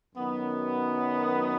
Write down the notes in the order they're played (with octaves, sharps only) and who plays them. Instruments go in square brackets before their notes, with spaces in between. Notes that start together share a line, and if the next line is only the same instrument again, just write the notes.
[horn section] F#2 D#3 F#3 B3